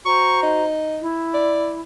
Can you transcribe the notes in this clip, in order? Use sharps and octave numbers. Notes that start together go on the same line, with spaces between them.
F#4 C5 A#5 C#6
D#4
E4
D5